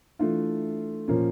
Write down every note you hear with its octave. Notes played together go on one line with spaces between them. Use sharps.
E3 A3 D4 F4
A#2 F3 A#3 C#4